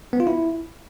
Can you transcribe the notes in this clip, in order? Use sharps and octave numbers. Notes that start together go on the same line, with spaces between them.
B3
F4
E4